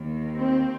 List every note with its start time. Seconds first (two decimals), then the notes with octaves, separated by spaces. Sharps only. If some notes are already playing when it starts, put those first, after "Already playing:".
Already playing: D#2 D#3 A#3
0.36 C4